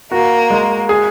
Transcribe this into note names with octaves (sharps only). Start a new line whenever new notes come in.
A#3 F#4
G#3
G#4